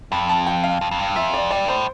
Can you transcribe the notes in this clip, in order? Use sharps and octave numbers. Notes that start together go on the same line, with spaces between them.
F2 B5
A5
G5
F5
F2
F2
G2
F2 E5
D5
G2 D5
A2 C5